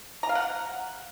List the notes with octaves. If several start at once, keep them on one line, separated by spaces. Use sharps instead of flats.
A#5
F5
F#5